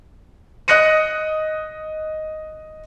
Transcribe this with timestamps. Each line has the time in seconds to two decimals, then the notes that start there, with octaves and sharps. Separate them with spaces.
0.68 D#5 D#6 F#6 A#6 C#7 D#7